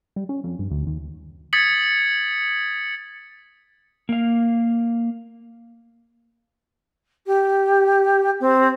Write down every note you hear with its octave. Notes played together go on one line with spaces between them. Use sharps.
G3
C#4
F2
G2
D2
D#2
D#6 G#6 A6 B6 C#7 F#7
A#3 F5
G4
C4